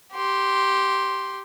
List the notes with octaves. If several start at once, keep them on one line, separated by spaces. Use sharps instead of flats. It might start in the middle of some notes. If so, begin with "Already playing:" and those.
G4 C6